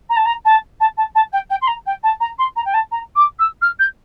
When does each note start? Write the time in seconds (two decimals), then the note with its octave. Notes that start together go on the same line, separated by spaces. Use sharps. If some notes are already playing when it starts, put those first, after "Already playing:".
0.09 A#5
0.16 A5
0.25 A#5
0.45 A5
0.80 A5
0.97 A5
1.15 A5
1.32 G5
1.49 G5
1.61 C6
1.67 A#5
1.86 G5
2.03 A5
2.20 A#5
2.38 C6
2.56 A#5
2.65 G5
2.73 A5
2.91 A#5
3.15 D6
3.39 E6
3.61 F6
3.79 G6